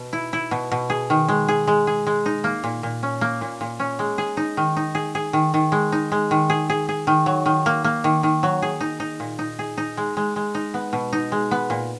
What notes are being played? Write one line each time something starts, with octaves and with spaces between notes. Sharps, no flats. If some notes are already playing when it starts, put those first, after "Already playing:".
Already playing: B2
E4
E4
B2
B2
G#4
D#3
G#3
G#4
G#3
G#4
G#3
D#4
A#3
A#2
A#2
C#4
A#3
A#2
A#2
C#4
G#3
G#4
D#4
D#3
D#4
G#4
G#4
D#3
D#3
G#3
D#4
G#3
D#3
G#4
G#4
G#4
D#3
F#3
D#3
A#3
A#3
D#3
D#3
F#3
G#4
D#4
D#4
A#2
D#4
G#4
D#4
G#3
G#3
G#3
D#4
B3
B2
D#4
G#3
B3
A#2